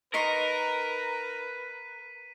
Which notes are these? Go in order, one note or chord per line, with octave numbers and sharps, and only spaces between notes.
D#4 A#4 B4 C6 C#6 B6 D#7